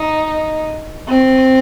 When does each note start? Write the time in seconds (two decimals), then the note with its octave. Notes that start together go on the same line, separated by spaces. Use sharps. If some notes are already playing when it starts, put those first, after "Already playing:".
Already playing: D#4
1.09 C4